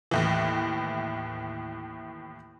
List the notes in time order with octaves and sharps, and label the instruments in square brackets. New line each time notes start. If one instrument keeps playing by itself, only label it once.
[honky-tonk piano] D#2 A2 E3